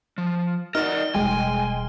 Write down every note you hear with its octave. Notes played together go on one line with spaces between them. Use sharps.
F3
D#4 A#4 D5 F#5 F6
E1 G3 G#3 G5 G#5